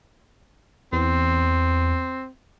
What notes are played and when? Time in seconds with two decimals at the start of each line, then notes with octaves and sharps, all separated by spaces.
0.92 E2 C4